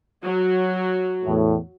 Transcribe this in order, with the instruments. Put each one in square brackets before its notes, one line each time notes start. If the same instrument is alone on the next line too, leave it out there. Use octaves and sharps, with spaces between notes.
[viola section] F#3
[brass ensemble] E2 A2 A3